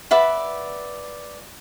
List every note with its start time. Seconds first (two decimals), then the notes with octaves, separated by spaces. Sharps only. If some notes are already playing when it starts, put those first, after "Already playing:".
0.11 B4 D5 E5 F#5